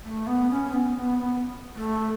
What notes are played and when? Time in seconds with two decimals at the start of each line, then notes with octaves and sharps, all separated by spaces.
0.04 A3
0.27 B3
0.50 C#4
0.73 B3
0.96 B3
1.19 B3
1.76 A3